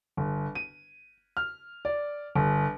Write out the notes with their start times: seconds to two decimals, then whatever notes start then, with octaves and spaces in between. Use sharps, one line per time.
0.17 G1
0.55 D#7
1.37 F6
1.85 D5
2.35 G1